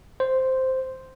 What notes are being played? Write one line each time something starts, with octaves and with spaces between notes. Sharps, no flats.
C5